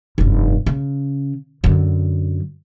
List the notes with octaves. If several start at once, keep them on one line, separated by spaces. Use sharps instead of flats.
F1 G2
C#3
F#2 D3